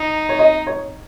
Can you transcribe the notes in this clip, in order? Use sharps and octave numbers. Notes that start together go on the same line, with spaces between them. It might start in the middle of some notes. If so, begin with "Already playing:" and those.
Already playing: D#4
C#5
D#5
C#5